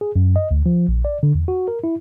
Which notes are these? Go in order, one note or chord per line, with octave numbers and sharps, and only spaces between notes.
G#4
F#2
D#5
D2
F3
A#1
D5
D3
E2
F#4
A#4
E4